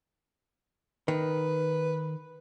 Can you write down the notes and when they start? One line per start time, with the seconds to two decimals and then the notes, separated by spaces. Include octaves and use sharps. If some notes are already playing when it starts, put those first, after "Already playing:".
1.08 D#3 B4